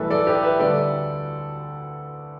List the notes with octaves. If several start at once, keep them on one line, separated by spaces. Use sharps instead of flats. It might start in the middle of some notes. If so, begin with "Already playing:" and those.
Already playing: B1 A2 E3 G3 A4 B4 E5
A4 D5
G4 B4
B4 E5
D2 D3 G3 A4 D5